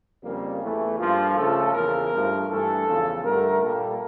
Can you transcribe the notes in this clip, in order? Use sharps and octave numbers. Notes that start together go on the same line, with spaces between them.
F2 C#3 G3 A#3
E2 E3 A3
G2 F3 A#3 F4
C#3 F3 A3 A4
E2 C#3 F3 A#3 A#4
G2 F3 A3
G2 E3 A3 A4
E2 C#3 F3
G2 D3 A3 A#4
A#2 G3 A#3 A4